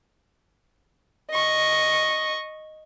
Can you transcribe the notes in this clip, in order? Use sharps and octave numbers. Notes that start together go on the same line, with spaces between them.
D#5 C#6